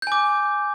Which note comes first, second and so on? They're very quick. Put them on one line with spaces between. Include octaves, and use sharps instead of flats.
G6 G#5 D6